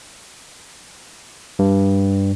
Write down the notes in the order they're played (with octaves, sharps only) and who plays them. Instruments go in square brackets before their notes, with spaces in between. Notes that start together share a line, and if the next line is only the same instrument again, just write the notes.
[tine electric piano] G2